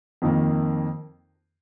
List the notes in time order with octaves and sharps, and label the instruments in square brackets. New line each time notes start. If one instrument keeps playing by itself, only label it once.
[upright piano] F2 D#3 A#3